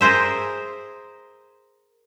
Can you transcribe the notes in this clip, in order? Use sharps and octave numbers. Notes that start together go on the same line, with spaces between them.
G#4 A#4 C5 E5